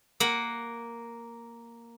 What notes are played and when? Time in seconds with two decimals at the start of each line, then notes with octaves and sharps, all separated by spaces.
0.20 A#3 F#5